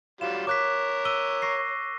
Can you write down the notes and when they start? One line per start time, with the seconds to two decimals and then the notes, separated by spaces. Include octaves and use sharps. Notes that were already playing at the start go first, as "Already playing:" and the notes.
0.21 F#3 G3 F4 E7
0.47 A#4 C#5 D6 F#6 B6
1.05 E6 D#7 G7
1.42 C#6 A#6 C7